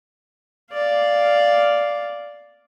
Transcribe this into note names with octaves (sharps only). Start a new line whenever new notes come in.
D5 F5